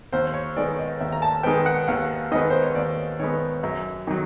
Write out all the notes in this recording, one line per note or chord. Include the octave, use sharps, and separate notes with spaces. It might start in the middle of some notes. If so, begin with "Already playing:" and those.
D#2 C5
C#5
D#3 G#3 B3 D5
D#5
D#2 E5
A#5
A5
D#3 G#3 B3 G5
F#5
D#2 F5
D#3 G#3 B3 D#5
C5
C#5
D#2 D5
D#3 G#3 B3 C#5
F#2
D#3 F#3